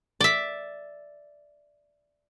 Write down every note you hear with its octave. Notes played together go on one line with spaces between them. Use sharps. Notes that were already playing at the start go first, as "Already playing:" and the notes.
D5 E5